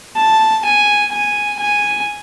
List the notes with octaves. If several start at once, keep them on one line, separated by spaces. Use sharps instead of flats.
A5
G#5
G#5
G#5